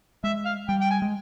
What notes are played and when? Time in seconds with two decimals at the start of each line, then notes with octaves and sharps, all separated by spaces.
0.24 G#3 E5
0.45 F5
0.68 G3 G5
0.81 G5
0.91 G#5
1.02 G#3